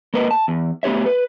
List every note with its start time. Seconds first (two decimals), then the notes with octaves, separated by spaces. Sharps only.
0.14 A#3 A#4 B4 D#5
0.31 A5
0.48 E2
0.83 A3 B3 G4 C#5 E5
1.06 B4